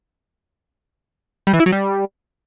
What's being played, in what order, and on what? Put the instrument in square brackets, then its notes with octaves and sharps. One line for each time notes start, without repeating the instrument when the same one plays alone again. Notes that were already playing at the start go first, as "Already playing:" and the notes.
[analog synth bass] G3
E3
E4
F#3
G3